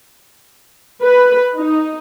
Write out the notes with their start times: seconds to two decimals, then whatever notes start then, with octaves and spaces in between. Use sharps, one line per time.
1.03 B4
1.58 D#4